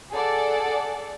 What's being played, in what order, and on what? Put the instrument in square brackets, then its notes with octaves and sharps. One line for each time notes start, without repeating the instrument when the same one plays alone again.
[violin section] G#4 A4 D5 F#5